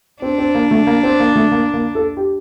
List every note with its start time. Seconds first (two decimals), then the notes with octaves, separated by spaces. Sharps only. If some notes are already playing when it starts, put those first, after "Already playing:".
0.22 C4 D4
0.38 C4
0.55 A#3
0.71 A3
0.87 A#3
1.03 C4
1.20 A#3
1.36 A3
1.52 A#3
1.74 A#3
1.95 A4
2.17 G4